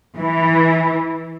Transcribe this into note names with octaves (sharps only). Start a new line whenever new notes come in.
E3